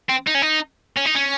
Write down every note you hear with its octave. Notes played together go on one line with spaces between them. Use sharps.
C4
D#4
C#4
D#4
C#4
D#4
C#4